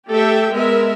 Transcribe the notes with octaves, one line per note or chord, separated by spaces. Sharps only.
A3 G4 A4 E5 G5
G#3 B3 A#4 E5